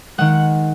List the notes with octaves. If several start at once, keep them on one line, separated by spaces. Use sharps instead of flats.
D#3 G#3 F#5